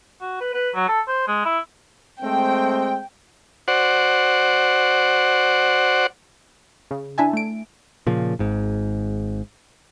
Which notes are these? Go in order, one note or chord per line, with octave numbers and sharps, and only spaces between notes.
F#4
B4
B4
F#3
A4
C5
G#3
E4
G#3 A3 C4 G5
F#4 C5 D5 F#5
C#3
D4 E4 E5 G#5 A5
A3 D7
A#2 C#3 F3
G#1 G#2